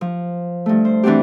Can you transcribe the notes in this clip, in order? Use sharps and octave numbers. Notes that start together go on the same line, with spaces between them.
F3
G2 A3
C5
E3 C4 D4 F#4 G4